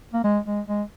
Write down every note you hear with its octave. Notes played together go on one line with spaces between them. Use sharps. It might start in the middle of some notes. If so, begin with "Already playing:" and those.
A#3
G#3
G#3
G#3